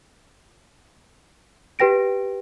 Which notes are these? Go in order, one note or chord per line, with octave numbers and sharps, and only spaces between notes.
G4 B4 G5 A#6 D7